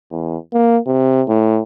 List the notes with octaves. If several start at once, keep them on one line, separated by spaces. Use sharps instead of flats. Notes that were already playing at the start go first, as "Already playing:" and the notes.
E2
A#3
C3
A2